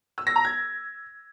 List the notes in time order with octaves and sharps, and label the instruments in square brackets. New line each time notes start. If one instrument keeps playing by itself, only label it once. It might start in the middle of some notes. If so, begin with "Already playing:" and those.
[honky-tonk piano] E6
A#6
A#5
G#6